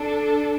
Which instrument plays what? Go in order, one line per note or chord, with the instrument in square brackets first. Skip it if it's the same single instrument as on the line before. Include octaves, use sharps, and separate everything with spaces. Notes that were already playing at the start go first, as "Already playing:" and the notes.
Already playing: [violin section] D4 A4